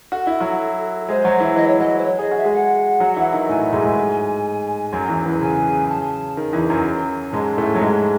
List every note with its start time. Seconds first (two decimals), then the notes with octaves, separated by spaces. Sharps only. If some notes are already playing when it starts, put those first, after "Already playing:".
0.12 F#4 A4
0.27 E4
0.40 F#3 F#4
1.09 G#3 G#4 C5
1.24 F#3 F#4
1.40 E3 E4
1.56 E3 E4 D#5
1.68 C#5
1.80 F#3 F#4 D#5
1.99 C5
2.04 C#5
2.19 G#4 D#5
2.31 F#4
2.37 E5
2.44 G#3 G#4
2.53 F#5
3.00 F#3 F#4
3.17 E3 E4
3.32 D#3 D#4
3.48 A2 A3 G#5
3.60 A2 A3
3.73 G#2 G#3
3.85 G#2 G#3
4.93 F#2 F#3
5.08 E2 E3
5.25 E2 E3
5.41 C#3 G#5
5.89 A5
6.37 D#3
6.53 E2 E3
6.70 F#2 F#3
7.33 G#2 G#3 A5
7.57 A2 A3
7.75 F#3
7.81 G#2 G#3